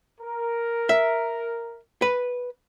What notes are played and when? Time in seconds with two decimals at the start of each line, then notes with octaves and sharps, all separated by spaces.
0.20 A#4
0.89 E5
2.02 B4